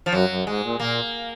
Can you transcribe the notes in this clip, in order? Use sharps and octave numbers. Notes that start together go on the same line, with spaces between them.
F3
F#2 F#3
F#2
G#2 G#3
A#2
A#2 A#3